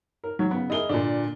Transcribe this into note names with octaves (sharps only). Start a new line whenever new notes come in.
A#4
F#3
C#3 B3
E4 G#4 A#4 D#5 G7
A#2 D3 D4